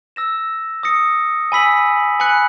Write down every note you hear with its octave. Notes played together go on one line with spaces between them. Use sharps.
E6 A#6 E7
D#6 A#6 C#7
G#5 B5 E6 B6 F#7
G#5 B5 F#6 C#7 F#7